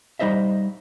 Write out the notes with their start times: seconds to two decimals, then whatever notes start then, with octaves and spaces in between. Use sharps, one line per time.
0.19 G3 D#4 C5 D#5 E5